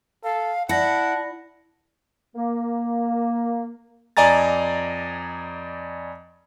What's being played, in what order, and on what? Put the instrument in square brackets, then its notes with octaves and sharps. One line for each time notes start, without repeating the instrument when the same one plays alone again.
[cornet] A4 [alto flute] F5
[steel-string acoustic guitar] E4 [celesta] D5 A#6 C#7 [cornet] F#5 [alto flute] A5
[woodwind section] A#3
[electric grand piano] F2 D5 D#5 G#5 A#5 A6